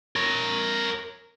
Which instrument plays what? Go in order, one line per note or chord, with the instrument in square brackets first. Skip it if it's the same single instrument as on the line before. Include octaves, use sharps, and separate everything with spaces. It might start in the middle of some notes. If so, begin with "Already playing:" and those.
[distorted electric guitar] A#4 C#5